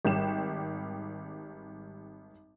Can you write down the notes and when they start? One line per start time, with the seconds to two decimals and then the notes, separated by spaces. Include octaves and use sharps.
0.05 G#1 G3 G5 E7